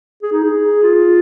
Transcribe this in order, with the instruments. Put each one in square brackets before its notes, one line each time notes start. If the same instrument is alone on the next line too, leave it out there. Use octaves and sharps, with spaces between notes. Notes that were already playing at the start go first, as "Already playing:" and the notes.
[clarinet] G#4
D#4
G#4
F4